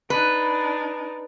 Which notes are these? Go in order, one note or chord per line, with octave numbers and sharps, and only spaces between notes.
D4 D#4 B4